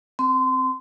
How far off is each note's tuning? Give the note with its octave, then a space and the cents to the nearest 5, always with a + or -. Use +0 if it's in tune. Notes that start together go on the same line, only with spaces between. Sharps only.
C4 +0 C6 -25